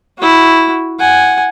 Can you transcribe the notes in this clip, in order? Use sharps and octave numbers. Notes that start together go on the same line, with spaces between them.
E4 F#4
F#5 G#5